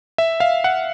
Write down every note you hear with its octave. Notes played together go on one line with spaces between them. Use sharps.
E5
F5
F#5